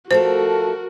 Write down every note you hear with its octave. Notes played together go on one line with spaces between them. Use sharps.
F3 A3 F#4 A4 A#4 C5